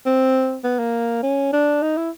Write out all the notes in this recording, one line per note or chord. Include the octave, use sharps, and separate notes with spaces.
C4
B3
A#3
C#4
D4
D#4
E4